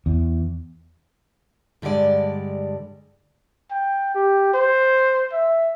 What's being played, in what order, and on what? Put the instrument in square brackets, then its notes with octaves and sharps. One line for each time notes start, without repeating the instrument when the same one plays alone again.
[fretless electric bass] E2
[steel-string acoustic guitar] G2 D3 G3 G#3 D5
[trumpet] G5
G4
C5
E5